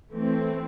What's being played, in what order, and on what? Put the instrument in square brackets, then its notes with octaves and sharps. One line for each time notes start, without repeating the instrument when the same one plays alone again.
[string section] E3 A3 C4